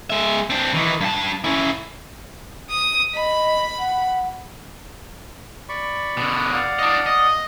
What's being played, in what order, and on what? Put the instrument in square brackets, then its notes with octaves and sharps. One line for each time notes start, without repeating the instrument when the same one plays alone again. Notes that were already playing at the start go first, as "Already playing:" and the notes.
[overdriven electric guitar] G#3 E5
C4 D4
D#3 E3
G2 A5
C#4 E4
[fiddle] D#6
[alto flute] D#5 [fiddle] B5
[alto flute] F#5
[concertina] D5 B5 C#6
[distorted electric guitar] B2 D3
[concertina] D5 F5 F#5
[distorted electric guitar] D4 D#5
D#5